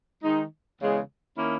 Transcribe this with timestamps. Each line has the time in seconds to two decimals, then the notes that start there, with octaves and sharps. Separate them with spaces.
0.23 D#3 G#3 D#4
0.79 E2 C#3 G#3
1.36 D#3 A#3 C#4 E4